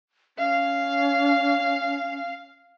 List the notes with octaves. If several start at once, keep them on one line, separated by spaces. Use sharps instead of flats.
C#4 F5